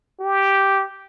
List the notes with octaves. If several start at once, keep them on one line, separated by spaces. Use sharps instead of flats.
G4